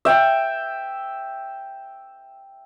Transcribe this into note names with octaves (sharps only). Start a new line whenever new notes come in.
E5 G5